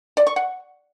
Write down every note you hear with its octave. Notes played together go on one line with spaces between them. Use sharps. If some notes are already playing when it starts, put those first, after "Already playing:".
D5
C#6
F#5